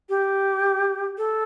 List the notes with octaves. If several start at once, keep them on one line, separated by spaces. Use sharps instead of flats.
G4
A4